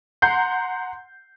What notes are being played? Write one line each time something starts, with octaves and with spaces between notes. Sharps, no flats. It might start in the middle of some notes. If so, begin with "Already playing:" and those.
F#5 A#5 C6 G6 C7